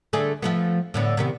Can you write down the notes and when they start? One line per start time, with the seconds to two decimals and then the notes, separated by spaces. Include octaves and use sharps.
0.13 D3 A3 G#4
0.42 F3 A3 B3
0.94 A2 D3 B3
1.17 C3 D#3 B3